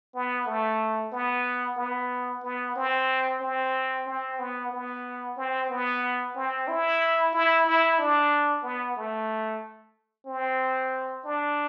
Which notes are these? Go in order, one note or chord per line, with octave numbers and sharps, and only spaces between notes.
B3
A3
B3
B3
B3
C4
C4
C4
B3
B3
C4
B3
C4
E4
E4
E4
D4
B3
A3
C4
D4